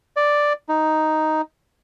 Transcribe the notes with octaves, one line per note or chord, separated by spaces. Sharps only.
D5
D#4